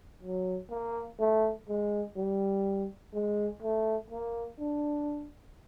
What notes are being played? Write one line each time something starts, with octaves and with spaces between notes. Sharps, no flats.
F#3
A#3
A3
G#3
G3
G#3
A3
A#3
D4